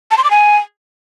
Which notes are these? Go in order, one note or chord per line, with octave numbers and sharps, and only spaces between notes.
A5
C6
D6
G#5